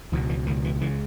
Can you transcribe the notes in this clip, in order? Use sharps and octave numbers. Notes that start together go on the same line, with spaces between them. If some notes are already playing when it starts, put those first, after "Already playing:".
C#2 B2 E3
E3
C#2 B2 D#3
E3
C#2 C#3 E3